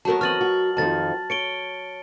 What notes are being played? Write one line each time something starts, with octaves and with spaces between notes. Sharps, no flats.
F#3 A3 B3 G#4 A#4 A5
E3 C4 A#4 D#5 F6 A6 F#7
F#4
F2 D#3 F3 A5 A6
C#5 C#7 D7 G7